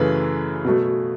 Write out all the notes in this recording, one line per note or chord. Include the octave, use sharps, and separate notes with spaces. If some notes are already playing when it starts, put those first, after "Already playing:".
Already playing: F#2 C#3 E3 A3 G#4 B4
B2 F#3 A3